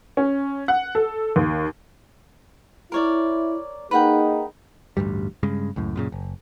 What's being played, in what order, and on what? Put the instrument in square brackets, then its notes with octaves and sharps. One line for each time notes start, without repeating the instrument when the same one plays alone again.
[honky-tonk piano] C#4
F#5
A4
D#2
[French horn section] E4 [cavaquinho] A#4 C#5 D5
[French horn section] A#3 D#4 G#4 [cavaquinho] B4 F#5 G5
[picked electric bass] A1 D2 G2 G3
G2 C#3 G#3
C#2 F#2 A2
F#2 A#2 C#3
F#1